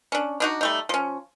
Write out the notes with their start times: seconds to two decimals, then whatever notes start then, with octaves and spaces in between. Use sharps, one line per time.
0.12 C#4 D4
0.40 D4 D#4 F#4
0.61 G3 A3 D#4
0.89 F3 C#4